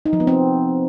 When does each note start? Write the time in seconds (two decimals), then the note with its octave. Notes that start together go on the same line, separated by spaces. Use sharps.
0.06 D#4
0.13 F3
0.20 B3
0.27 C4